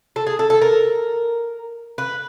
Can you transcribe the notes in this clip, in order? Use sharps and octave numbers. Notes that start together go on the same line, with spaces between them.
A4
G#4
A4
A4
A#4
B4